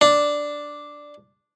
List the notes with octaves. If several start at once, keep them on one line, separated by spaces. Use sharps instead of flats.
D4